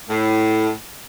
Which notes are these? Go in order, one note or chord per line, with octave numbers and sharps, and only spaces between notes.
A2